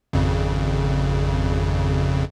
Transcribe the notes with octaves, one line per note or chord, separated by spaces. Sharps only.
G#1 F2 C#3